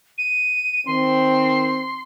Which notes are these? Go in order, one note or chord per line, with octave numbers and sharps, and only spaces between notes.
D#7
D#3 C4 C6